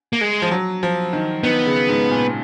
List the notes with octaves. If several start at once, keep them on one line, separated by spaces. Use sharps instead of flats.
A#3
G#3
F3
F#3
F3
D#3
D#3 B3
C#3
G#2
A#2